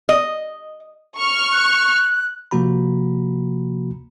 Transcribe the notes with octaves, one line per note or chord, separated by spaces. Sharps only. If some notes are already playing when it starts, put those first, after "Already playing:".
D#5
C#6 F6
F#6
C3 F3 A#3 F#4 A#5 B5